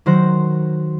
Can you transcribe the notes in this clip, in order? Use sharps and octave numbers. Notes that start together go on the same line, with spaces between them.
D#3 F#3 C5 F#6 A#6